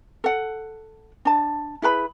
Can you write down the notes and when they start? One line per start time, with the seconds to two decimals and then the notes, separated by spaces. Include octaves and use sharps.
0.24 A4 F#5
1.25 D4 A5
1.82 E4 G#4 B4 B5